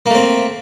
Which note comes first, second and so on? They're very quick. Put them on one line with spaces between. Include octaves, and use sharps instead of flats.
A#3 A3 C4